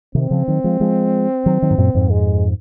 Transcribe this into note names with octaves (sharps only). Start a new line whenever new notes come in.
C3 D#3 C4
C#3 F3
D#3 F#3
F3 G#3
F3 G#3
D#3 F#3
D#3 F#3
G#2
F#2 A#2
F2 G#2
G#3